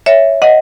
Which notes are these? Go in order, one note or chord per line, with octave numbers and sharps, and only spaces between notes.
C#5 E5
D#5 F#5